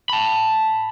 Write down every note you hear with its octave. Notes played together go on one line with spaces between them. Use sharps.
A5 B5